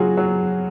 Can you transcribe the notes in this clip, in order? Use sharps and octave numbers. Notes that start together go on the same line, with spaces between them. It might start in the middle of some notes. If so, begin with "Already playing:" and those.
Already playing: C#3 F#3 F4 F#4 G#4
F#3